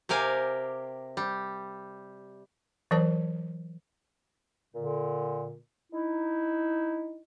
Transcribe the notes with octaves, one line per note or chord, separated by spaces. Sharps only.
C3 G4 A#4 F5 G#5
G3
E3 F#3 A#4 C5 A5
A#2 D3
D#4 E4